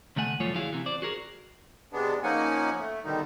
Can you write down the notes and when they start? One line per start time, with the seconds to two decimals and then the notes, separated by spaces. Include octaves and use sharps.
0.16 D2 C3 A3 F#5 G#5
0.40 C2 F#2 F3 A3 F4 C#5
0.55 D2 E4 F#4 G#4 F5
0.72 C3 E3
0.86 C5 D5
1.02 F#4 G#4 A#4
1.93 C3 G#3 B3 D4
2.23 F3 A#3 C#4 D#4 F#5 G#5
2.79 A3
3.04 B2 D3 D#3 G3 D#4